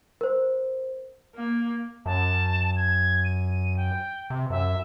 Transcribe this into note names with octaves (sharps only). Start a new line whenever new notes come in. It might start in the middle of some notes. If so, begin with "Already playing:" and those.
A#4 C5
A#3
F#2 A5
G#6
D#7
G5
C3
F#2 E5